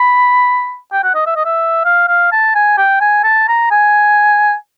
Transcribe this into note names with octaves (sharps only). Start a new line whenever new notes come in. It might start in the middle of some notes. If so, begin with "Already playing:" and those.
Already playing: B5
G5
F#5
D#5
E5
D#5
E5
F5
F5
A5
G#5
G5
G#5
A5
A#5
G#5